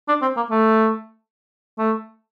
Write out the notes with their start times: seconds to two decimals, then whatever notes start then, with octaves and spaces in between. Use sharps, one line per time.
0.08 D4
0.22 C4
0.37 A#3
0.50 A3
1.78 A3